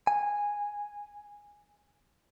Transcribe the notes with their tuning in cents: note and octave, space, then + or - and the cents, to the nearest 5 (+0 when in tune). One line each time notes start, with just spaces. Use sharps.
G#5 -10